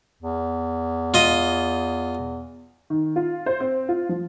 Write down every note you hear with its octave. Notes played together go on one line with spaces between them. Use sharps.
E2
F4 D#5
D#3
F4
C5
C4
F4
F3